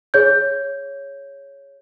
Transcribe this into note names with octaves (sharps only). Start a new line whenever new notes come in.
G#4 C#5 G6